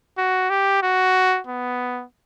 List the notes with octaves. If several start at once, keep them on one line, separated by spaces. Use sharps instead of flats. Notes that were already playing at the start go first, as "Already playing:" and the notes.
F#4
G4
F#4
B3